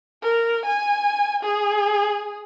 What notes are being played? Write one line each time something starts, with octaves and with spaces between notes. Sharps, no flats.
A#4
G#5
G#4